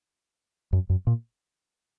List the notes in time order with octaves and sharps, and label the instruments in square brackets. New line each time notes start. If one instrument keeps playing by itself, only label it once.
[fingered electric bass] F#2
F#2
A#2